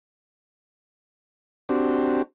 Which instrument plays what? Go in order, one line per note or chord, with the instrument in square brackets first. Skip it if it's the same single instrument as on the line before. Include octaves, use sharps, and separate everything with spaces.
[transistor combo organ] C4 D4 F#4 G4